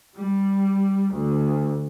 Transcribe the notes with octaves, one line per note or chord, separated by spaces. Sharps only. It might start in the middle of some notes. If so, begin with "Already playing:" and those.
G3
D2